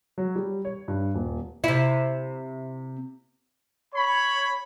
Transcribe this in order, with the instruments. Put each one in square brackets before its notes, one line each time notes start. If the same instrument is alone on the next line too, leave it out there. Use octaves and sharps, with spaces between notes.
[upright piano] F#3
G3
C#5
G2
D#1
[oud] C3 E4
[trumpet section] C#5 B5